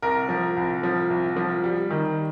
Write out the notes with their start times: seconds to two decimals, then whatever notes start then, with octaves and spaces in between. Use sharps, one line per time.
0.02 C2 A#4
0.29 F3
0.57 C2
0.83 F3
1.10 C2
1.36 F3
1.64 G3
1.91 D#3